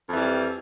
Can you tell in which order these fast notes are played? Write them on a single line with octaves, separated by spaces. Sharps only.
F2 E3 G3